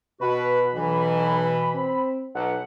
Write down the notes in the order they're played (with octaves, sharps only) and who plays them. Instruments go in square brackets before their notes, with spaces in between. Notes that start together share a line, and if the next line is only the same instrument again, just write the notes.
[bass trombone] B2 [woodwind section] F#4 B4 [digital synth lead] B5
[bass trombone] B1 [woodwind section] B2 E3
[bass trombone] C4
[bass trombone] B1 [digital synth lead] F#5